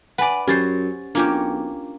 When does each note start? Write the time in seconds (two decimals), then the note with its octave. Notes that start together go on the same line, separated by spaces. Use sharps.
0.18 B4 D5 F#5 G#5
0.47 F#2 C#4 F#4 G4 C5 A6
1.15 B1 A#3 C#4 D4 F4 G4